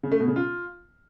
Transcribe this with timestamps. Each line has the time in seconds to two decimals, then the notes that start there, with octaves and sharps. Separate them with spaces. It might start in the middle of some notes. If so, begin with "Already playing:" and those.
0.03 C#3
0.12 A3
0.20 B2
0.28 C#3
0.36 F4